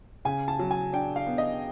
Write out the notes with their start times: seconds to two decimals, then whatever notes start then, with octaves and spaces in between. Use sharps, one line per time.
0.25 C#3 G#5
0.48 A5
0.59 F#3
0.71 G#5
0.93 D4 G5
1.16 F5
1.26 B3
1.38 D#5